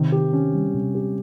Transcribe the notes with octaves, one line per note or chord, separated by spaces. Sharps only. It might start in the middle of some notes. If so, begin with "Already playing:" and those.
Already playing: C3 D#3
G4
C#4
G3
C3
G4